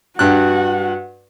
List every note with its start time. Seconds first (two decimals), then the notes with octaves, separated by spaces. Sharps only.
0.19 G2 F#4 F#5 F#6